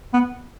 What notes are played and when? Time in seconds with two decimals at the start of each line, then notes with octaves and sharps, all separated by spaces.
0.14 B3